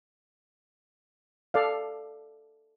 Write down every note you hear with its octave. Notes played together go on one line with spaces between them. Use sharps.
A4 D5 F5